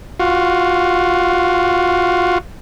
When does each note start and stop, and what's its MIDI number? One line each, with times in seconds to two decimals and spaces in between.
0.20 2.38 65
0.20 2.38 66